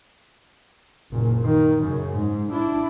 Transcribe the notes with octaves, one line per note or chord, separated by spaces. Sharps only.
F#1 A#2
D#3
F#2 C#3
G#2
D4 E4